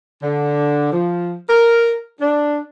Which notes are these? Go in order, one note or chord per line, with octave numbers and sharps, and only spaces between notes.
D3
F3
A#4
D4